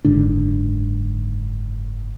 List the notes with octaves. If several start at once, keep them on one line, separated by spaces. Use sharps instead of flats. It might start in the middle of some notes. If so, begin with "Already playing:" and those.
F#1 G#2 D3 D4